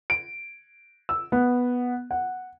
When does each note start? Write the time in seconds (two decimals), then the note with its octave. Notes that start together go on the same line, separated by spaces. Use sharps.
0.10 D7
1.09 E6
1.32 B3
2.11 F#5